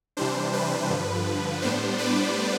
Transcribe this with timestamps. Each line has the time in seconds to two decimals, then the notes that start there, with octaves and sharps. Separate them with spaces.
0.17 C3 E3 G3 D4 C5
0.53 B4
0.89 G2 D3 F3
1.62 A2 G3 B3 D4 C5
1.98 B4 D5